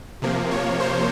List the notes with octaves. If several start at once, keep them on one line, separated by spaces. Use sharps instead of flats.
C3 F3 A#3
C#5
C5